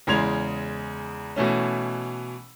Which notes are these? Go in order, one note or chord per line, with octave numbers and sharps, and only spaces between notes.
E2 C#3 G#3 C6 G#6 F7
B2 E3 A3 C#4